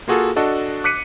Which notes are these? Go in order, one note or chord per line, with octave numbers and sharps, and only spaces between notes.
A#3 F4 F#4 G#4 A4
D4 F#4 A4 D#5
D6 F#6 B6 C#7 D#7